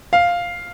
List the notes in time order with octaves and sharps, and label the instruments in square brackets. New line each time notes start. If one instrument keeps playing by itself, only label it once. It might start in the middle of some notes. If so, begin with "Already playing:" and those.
[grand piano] F5